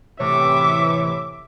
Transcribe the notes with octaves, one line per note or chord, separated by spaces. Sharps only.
A2 C3 E3 C#5 E5 D6